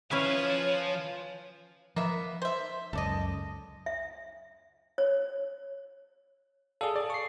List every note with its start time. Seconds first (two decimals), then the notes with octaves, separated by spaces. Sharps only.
0.11 F3 C#4 E4 B4 C#5 E5 F5 G#5
1.96 F3 A#3 B3 E5
2.42 C5 E5
2.93 C#2 F#2 A4 D5 D#5
3.86 E5
4.98 C#5
6.81 G#4 A4 D5 F5
6.96 D5
7.10 C#6 C7